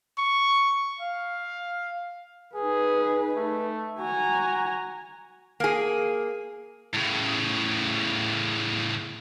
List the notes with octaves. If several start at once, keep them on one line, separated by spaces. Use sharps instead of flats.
C#6
F5
D#4 G#4 B4
A3
F#4 G#5 A#5
A#3 G#4
A2 C#3